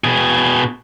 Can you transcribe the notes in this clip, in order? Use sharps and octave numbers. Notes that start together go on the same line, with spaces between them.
B2 G#4